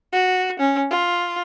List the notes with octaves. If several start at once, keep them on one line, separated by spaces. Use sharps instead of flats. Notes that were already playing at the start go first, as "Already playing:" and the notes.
F#4
C#4
F4